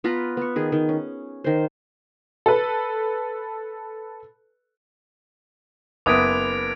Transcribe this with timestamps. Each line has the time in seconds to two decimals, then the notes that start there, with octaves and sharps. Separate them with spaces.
0.04 B3 F4 B4 A#5
0.37 B3 C#6
0.56 D#3 G#4
0.72 D#3
0.89 C#4
1.44 D#3 C5
2.46 A4 B4
6.06 F#1 B3 D6 D#6 G#6 D7